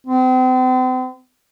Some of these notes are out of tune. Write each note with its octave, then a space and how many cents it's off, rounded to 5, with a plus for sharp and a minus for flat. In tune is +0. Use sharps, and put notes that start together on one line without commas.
C4 -40